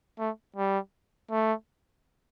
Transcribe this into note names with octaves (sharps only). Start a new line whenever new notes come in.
A3
G3
A3